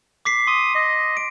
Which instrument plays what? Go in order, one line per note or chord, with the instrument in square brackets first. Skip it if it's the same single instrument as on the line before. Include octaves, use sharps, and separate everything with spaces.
[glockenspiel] D6 B6 C7
[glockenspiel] C6 [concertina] D#6
[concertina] D#5
[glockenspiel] D7